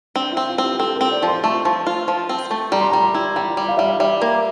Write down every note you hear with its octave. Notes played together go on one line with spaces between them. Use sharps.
C4 D4
E4
C4
F4
C4
G4
C4 A4
C4 A#4
D5
F3
C6
A3 A5
F3
F4
F3
C4
A3
G3 A#5
C6
G3 A#5
E4
G3 G5
G3
F5
G3 E5
F5
G3 E5
A#3